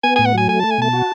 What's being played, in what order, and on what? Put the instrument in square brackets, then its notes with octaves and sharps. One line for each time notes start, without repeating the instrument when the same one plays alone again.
[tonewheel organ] B3 [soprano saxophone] G#5
[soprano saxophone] G#5
[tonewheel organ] A2
[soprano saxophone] F#5
[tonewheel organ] F#3 [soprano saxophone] G#5
[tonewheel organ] A3 [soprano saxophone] G#5
[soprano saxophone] A5
[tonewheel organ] A3
[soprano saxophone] G#5
[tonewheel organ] B2 [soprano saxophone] A5
[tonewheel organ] F#4